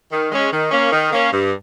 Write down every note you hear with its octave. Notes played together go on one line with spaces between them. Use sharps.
D#3
G#3 C#4
D#3
A#3 C#4
D#3
A#3 C#4
G2